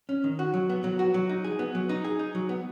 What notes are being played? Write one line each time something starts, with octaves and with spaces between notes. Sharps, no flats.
C#4
D#3
F#4
F#3
B3
F#3
F#4
F#3
D#4
G#4
B3
F#3
D#4
G#4
D#4
F#3
B3